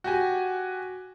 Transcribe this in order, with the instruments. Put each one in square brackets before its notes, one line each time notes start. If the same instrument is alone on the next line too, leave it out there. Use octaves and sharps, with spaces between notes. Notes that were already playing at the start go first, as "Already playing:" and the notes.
[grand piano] F#4 G4 G#5